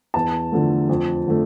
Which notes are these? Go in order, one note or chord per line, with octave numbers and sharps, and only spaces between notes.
E2 A5
D3 F3 A3
F2
D3 F3 A3